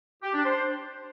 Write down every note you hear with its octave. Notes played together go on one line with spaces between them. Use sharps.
G4
D4
C5